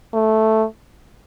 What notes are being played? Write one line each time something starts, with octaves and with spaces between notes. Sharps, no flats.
A3